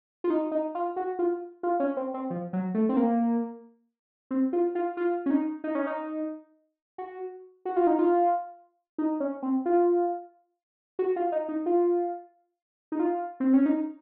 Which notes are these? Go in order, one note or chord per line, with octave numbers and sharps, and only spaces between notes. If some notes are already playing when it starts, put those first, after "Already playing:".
F4
D#4
D#4
F4
F#4
F4
F4
C#4
C4
C4
F3
F#3
A3
C4
A#3
C4
F4
F4
F4
C#4
D#4
D#4
C#4
D#4
F#4
F#4
F4
D#4
F4
D#4
C#4
C4
F4
F#4
F4
D#4
D#4
F4
D#4
F4
C4
C#4
D#4